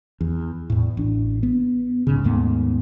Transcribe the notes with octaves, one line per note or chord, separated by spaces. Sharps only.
E2
E2 A2
A1 D4
B3
C2 G#2 C#3
D#2 G#2 A3 B3